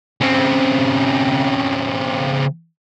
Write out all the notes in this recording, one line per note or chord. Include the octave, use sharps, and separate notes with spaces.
C#3 C4